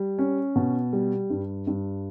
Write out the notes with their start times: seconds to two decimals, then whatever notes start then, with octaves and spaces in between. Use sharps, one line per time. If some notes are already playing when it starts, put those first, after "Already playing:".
Already playing: G3
0.19 C#4
0.55 B2
0.93 G3
1.30 G2
1.67 G2